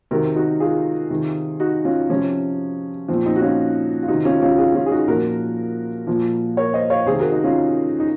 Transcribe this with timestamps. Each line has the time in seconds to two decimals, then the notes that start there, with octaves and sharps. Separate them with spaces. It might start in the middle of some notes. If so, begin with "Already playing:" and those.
0.11 C3 D#3 F#4 A#4
0.36 D#4 F#4
0.60 F4 G#4
1.10 C3 D#3
1.60 D#4 F#4
1.85 C#4 F4
2.09 C3 F3 C#4
3.09 A#2 F3 C4
3.26 C4 D#4
3.36 F#4
3.42 C#4 F4
4.03 F4
4.08 C3 D#3 D#4 F#4
4.25 C#4 F4
4.42 C#4 F4
4.50 F#4
4.58 F4 G#4
4.75 C#4 F4
4.86 G#4
4.91 D#4 F#4
5.08 A#2 F3 F#4 A#4
6.07 A#2 F3
6.57 A#4 C#5
6.74 C5 D#5
6.90 C#5 F5
7.06 C3 D#3 G#4 C5
7.19 F#4 A#4
7.32 D#4 F#4
7.44 C#4 F4
8.00 D#4